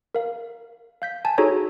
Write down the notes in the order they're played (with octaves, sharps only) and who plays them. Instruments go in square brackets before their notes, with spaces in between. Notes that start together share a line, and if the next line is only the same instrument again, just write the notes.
[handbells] A#4 F5
F5 G6 B6
G#5 A5
D#4 F#4 G#4 A4 C#5 A#5